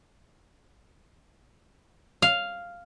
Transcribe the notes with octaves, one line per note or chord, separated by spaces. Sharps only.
F5